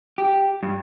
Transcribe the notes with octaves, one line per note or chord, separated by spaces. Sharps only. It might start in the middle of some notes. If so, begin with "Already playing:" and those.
G4
G2